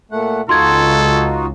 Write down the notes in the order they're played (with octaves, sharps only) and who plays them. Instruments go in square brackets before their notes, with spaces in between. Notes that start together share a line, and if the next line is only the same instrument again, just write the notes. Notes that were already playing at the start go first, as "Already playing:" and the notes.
[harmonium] A#2 A3 F#5
[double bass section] C#2 [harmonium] D#4 F4 F#4 [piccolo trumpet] A4 [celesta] C6 G#6